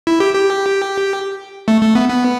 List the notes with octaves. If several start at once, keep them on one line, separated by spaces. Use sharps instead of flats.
E4
G4
G4
A3
A3
B3
B3